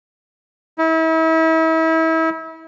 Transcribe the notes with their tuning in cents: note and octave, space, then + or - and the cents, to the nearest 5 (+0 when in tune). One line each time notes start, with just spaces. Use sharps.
E4 -35